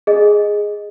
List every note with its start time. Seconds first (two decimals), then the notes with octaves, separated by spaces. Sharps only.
0.07 G#4 D#5